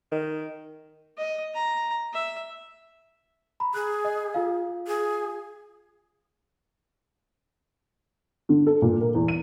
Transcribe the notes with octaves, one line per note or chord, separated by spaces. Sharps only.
D#3
D#5
A#5
E5
A#5 B5
G#4 F#6
D#5
F4 F5
G#4
D3
A4
A#2
A#4
E2
D#7